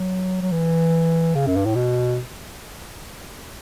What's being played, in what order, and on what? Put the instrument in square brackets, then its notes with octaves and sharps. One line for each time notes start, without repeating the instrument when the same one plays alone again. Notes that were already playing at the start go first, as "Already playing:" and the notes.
Already playing: [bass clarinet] F#3
F#3
E3
C#3
F#2
G2
A2
B2